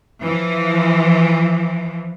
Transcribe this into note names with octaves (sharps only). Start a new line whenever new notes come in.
E3 F3